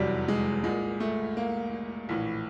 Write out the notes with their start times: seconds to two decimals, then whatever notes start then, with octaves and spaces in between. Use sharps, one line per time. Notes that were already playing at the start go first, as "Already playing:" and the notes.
Already playing: F1 E2 C3 F#3 G3
0.28 G#3
0.64 C2 A#2 G#3
1.00 A3
1.37 A#3
2.09 A#1 A2 E3